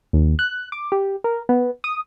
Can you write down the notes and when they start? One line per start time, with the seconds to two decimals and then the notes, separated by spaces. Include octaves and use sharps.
0.13 D#2
0.39 F#6
0.72 D6
0.92 G4
1.24 A#4
1.49 B3
1.84 D#6